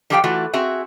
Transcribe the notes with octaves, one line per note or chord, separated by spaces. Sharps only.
F3 G3 G4 A4 F5 G5
E3 A3 F4 F#4
C4 F#4 G#4 E5